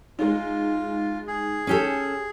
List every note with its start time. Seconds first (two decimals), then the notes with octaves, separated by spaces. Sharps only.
0.19 G#3 D#4 F4
1.27 G#4
1.67 C#4 G4 A4